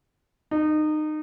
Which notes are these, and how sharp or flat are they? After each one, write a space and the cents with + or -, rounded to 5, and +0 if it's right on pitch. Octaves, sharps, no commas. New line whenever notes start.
D#4 -25